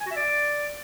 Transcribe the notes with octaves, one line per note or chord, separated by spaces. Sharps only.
G#5
F#4
E5
D5